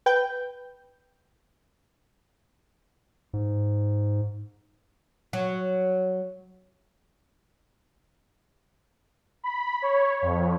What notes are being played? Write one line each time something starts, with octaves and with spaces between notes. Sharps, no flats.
B4 G5 G6
G#2
F#3
B5
C#5
F2